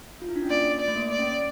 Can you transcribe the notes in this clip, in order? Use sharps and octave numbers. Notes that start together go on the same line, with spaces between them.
F4
E4
D4
C#4
A#3 D5
D5
A3
A#3
D5
C#4